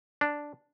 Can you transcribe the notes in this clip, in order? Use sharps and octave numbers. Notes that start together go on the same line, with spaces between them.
D4